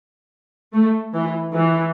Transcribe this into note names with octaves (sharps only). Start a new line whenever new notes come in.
A3
E3
E3